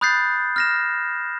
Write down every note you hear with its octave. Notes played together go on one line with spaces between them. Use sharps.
B5 D#6 F#6 G6 A6 C7
F6 A#6 E7